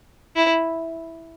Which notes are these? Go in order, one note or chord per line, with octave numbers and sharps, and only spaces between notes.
E4